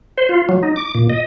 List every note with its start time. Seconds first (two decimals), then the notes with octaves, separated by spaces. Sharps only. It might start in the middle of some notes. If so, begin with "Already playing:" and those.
0.18 C5
0.29 F4
0.49 F#3
0.63 D#4
0.76 D6
0.95 A#2
1.10 D#5